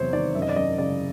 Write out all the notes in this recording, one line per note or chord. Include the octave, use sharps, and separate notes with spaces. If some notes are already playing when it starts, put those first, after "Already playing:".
Already playing: E2 C3 F#3 C5 C#5
D#3 D5
F#2 E5
D#5
D5
F#2 D#5
C#3 D5